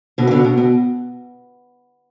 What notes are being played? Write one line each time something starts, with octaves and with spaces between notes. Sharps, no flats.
B2 D3
E3
B2 D3
B2
B2